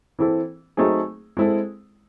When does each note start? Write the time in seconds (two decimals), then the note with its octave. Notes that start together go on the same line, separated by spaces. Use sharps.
0.19 E3 C4 E4 A4
0.77 F#3 A3 C4 D#4 G#4
1.37 G#3 C4 E4 A4